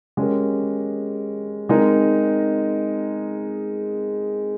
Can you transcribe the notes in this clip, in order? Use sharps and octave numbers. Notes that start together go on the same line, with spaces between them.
G#3 C#4 G4 A#4
G#3 C4 D#4 A#4